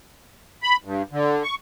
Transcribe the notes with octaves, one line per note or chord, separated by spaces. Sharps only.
B5
G2
D3
C#6